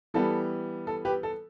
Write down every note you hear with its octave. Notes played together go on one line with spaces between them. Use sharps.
E3 G3 B3 A4
A4
G4 B4
A4